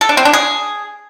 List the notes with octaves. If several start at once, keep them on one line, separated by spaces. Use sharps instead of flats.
A4
D4
C4
D4
G#4